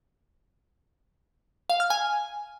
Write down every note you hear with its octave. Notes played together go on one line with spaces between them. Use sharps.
F5
F6
G#5